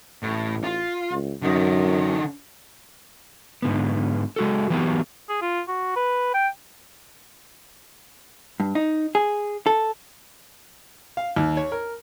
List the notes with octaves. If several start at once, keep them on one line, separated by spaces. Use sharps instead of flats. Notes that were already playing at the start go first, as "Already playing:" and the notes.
A1 A2
F4
C#2
F#2 D3 D#4
G#2 D3 B3
G#3 F#4 A4
E3 F#3 B3 G4 A#4
G#4
F4
F#4
B4
G5
G2
D#4
G#4
A4
F5
D#2
C#5
A#4